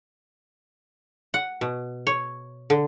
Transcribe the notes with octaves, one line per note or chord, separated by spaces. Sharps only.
F#5
B2
C#5
D3